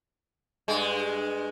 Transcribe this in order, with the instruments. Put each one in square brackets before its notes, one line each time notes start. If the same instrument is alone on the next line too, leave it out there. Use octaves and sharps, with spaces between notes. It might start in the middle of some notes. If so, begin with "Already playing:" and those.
[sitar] G2 G#3